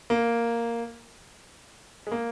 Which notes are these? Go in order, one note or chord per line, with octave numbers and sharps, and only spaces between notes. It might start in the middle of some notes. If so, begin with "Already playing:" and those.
A#3
G#3
A#3